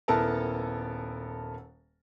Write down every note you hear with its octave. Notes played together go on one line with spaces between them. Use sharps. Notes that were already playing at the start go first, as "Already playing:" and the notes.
D#1 B3 E4 A4 A#4 A5